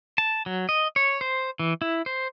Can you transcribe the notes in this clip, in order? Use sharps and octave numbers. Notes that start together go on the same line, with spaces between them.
A5
F#3
D#5
C#5
C5
E3
E4
C5